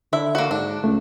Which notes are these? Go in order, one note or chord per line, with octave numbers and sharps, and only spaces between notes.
D3 E4 E5
A#3 F#4
G#2 D4
C#2 A3